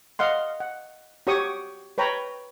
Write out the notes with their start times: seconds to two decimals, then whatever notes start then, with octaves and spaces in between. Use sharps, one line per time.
0.19 D#5 F5 F#5 C6
0.60 F#5
1.27 F#4 G4 C#5 C#6 D#6
1.98 B4 C#5 G5 A#5 B5